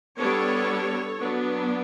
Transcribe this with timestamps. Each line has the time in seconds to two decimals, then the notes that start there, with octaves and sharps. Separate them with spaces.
0.19 G3 B3 D4 A4 C#5
1.19 F#3 B3 D4